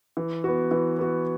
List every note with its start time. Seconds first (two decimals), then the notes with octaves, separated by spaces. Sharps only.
0.17 E3
0.44 B3 F#4
0.71 E3
0.99 B3 F#4